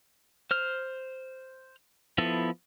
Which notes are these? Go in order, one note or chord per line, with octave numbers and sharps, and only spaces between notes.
C5 F6
F3 B3 E4 A4